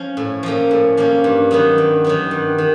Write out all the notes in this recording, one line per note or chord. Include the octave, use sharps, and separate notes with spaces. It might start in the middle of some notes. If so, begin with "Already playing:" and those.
Already playing: F3 C#4
A2
F3 A#3 C#4
A2
F3 A#3 C#4
G2
D#3 F#3 B3
G2
D#3 F#3 B3
G2
D#3